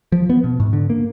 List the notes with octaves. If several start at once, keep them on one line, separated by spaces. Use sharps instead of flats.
F3
B3
B2
G#2
D3
A#3